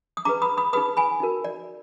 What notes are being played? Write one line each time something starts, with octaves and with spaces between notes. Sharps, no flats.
D#6
D4 G#4 B4 A#5 D6
B5 D#6
B5 D#6
D#4 G#4 B4 B5 D#6
G#5 B5
D#4 F#4 A#4
D5